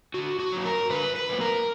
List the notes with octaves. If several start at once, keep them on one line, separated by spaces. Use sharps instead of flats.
D3 F#4
F#4
F#3 A#3
A#4
D3 B4
B4
F#3 A#3
A#4